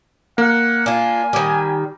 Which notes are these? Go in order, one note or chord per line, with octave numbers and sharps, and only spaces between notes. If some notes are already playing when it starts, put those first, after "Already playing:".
A#3 F#5
D4 F4 G#5
D#3 G3